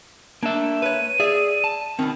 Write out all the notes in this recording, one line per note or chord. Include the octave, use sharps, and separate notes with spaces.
A#3 D4 E5
B4 C#5 D#7
G#4 D5 E5
A5
B2 D#3 C4